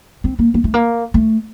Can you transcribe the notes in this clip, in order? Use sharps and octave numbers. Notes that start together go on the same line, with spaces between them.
C4
A#3
A#3
A3
A#3
A3